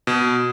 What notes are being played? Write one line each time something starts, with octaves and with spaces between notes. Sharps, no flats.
B2